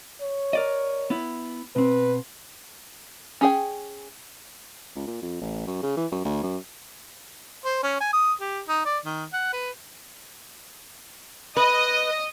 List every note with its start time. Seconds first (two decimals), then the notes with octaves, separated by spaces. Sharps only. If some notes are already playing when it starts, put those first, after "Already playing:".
0.22 C#5
0.53 A#4 D5 D#5
1.10 B3 E4
1.76 B2 C4 B4
3.41 C#4 G#4 G5
4.96 C#2
5.07 A#2
5.22 F2
5.41 A1
5.67 F#2
5.83 C#3
5.97 E3
6.11 F#2
6.25 D2
6.43 F#2
7.65 C5
7.83 C#4
8.00 G#5
8.13 D#6
8.41 G4
8.68 D#4
8.85 D5
9.05 D#3
9.33 F#5
9.53 B4
11.57 B4 D#5